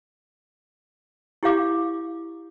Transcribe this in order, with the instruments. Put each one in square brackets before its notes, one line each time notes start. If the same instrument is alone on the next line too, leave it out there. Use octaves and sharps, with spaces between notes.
[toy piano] E4 G4 C#5 F5 D6